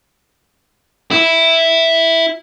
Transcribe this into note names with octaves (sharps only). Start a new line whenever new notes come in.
E4